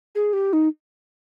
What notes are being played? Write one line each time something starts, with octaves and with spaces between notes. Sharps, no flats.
G#4
G4
D#4